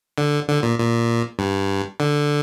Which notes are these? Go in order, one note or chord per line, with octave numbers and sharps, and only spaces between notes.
D3
D3
A#2
A#2
G2
D3